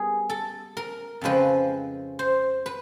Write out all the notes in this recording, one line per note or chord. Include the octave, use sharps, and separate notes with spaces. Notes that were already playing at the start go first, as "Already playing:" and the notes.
Already playing: G3 B3 G#4 A#4
A4
A#4
F2 C#3 F3 G#3 C4 B4
C5
B4